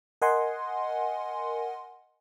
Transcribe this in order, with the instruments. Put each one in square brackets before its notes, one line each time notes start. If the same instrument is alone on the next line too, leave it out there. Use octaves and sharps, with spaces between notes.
[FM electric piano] A#4 D#5 F#5 G#5 C6